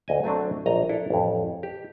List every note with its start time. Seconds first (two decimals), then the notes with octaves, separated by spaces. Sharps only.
0.08 D2 D#5 G#5
0.24 F#3 A3 C4 D4
0.66 A#1 D#5 A#5
0.89 D4 E4 A4
1.10 A1 F2
1.63 G4